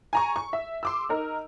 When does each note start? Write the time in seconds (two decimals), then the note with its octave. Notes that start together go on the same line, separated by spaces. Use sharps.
0.13 G#5 A#5 C#6
0.36 C#6
0.53 E5
0.83 C6 D6 E6
1.09 D#4 A#4